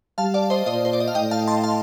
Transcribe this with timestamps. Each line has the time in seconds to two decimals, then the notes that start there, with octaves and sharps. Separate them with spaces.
0.18 G3 F5 A5
0.34 D5 F5
0.50 C5 D#5
0.66 A#2 C5 D#5
0.85 C5
0.93 D5
1.00 D#5
1.08 F5
1.15 A2 D#5 G5
1.31 F5 A5
1.48 A5 C6
1.64 F5 A5